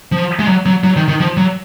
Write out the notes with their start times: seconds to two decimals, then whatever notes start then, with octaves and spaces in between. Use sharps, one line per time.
0.12 F3
0.39 G#3
0.48 F#3
0.66 F#3
0.84 F#3
0.96 D#3
1.08 D#3
1.20 F3
1.37 F#3